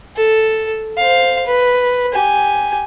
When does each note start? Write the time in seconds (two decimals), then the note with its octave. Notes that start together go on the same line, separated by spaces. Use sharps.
0.16 A4
0.97 C5 F5
1.46 B4
2.13 G4 G#5